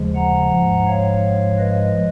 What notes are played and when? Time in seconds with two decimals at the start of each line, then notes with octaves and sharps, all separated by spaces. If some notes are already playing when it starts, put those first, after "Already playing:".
Already playing: D#2 C#3 F3 G#3
0.15 F#5 A#5
0.51 G#2 F3 G#3
0.87 C#5 F5
1.59 B4 D#5